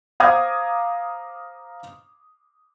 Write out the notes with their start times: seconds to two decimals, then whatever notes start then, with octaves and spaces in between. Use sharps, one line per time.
0.20 C5 F5 A#5 D6 D#6 G#6